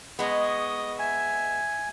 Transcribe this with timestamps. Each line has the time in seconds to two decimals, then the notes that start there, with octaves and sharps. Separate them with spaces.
0.19 G#3 B3 D#5 C#6
0.99 E5 G#5